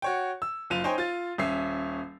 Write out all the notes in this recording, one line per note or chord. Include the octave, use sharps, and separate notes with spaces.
F#4 C#5 G5
E6
F#1 F4 D#7 F7
D#4 C5 C#5 G5 G#5
F4 A6
D#1 C#4 E5 C7